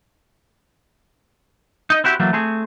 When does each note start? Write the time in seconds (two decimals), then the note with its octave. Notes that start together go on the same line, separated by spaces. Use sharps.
1.90 D#4 D#5
2.04 C4 E4 F#4 G4
2.20 E3 F#3 A3 A#3
2.33 A3 C4 G#4